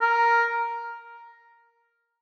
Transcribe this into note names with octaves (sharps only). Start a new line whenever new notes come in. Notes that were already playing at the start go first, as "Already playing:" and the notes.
A#4